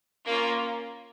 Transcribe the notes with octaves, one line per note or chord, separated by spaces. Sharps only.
A#3 C#4 F4